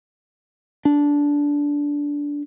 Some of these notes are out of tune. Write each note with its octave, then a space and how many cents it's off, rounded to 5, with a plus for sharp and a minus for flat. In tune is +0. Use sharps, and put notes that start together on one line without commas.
D4 -15